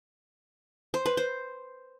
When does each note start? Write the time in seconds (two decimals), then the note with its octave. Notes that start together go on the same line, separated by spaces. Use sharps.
0.94 C5
1.06 B4
1.17 C5